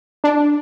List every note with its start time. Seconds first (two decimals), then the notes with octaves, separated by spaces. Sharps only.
0.24 D4